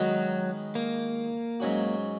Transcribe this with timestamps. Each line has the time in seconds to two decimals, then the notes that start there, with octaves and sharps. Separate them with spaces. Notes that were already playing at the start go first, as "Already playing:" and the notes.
Already playing: D#3 F#3 G#3 B3 F#4
0.75 A#3
1.60 G#2 F#3 C#4 F#4